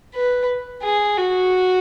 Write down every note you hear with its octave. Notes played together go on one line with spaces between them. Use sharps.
B4
G#4
F#4